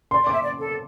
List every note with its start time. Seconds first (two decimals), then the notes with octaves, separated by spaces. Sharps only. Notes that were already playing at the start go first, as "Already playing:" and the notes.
0.11 D5 C6
0.23 D5
0.27 D6
0.32 E5
0.43 D5
0.59 A4